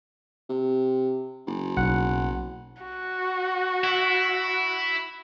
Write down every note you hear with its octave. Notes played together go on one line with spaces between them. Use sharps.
C3
F#1
B1 F#5
F#4
E4